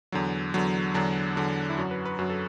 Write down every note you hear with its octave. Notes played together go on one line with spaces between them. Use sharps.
E2 D3 F#3
E2 D3 F#3
E2 D3 F#3 D4
E2 D3 F#3
E4
F#2 F#3 F#4
B4
B4
F#2 F#3 F#4
A4